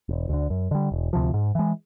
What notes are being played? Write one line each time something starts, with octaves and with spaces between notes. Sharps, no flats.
E1
D2 D3
F#2
D3 G3
E1
D2 C3 F3
G#2
E3 G#3